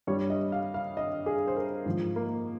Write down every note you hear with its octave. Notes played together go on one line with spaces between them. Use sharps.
G2 G3 C#5
D#5
F5
F5
D#5
G#4
C5
A#4
G#2 F3
A#3